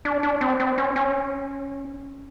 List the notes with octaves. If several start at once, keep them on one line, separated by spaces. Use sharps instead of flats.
D4
D4
C4
C4
C#4
C#4